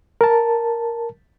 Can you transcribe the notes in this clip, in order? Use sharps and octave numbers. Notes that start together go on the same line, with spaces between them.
A#4 A5